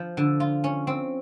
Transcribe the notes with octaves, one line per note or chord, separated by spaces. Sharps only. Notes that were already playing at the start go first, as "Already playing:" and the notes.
Already playing: F3
D3
F4
C#4
C4